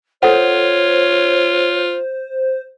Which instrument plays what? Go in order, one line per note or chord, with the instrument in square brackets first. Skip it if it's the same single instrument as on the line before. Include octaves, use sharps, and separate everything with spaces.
[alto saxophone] F4 [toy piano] A4 F#5 [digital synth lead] C5 [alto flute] C#5